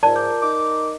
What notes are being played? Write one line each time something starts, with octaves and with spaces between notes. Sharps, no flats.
G#2 F4 A#4 D5 A5
D6 G6
A#4
D#4 D6